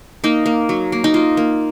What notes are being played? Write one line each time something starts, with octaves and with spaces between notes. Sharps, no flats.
A#3 D#4
A#3
F#3
A#3
D#4
A#3 F4
A#3